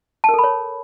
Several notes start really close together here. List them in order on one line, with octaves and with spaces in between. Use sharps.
A5 A#4 A4 B5 C#5